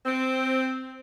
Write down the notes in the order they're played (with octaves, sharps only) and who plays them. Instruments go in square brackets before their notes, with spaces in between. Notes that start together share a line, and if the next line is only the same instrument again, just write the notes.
[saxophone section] C4